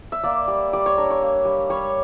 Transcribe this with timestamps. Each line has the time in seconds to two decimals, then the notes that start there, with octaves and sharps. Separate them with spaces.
0.12 E5
0.23 A#3 D5
0.48 G3
0.73 G3 D5
0.86 C#5
0.98 D4 A#4
1.10 C#5
1.22 A#3
1.45 G3
1.69 G3 C#5